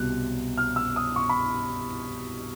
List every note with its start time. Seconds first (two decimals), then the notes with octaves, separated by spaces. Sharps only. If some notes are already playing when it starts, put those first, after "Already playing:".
Already playing: C2 B2 F#6
0.57 F6
0.76 E6
0.96 D#6
1.16 C#6
1.29 B5